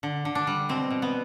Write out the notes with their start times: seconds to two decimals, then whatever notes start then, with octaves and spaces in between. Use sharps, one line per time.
0.03 D3
0.25 D3
0.35 D4
0.47 G3
0.69 B2 C4
0.90 B2
1.02 B3